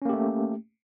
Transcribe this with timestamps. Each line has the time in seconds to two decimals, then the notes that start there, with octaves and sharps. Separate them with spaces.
0.02 C#4
0.05 A#3
0.09 G4
0.13 A3